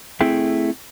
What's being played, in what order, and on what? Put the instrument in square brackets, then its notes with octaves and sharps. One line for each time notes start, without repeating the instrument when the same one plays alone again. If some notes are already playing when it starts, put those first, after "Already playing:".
[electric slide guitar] A3 C4 E4 G#4 E5 G5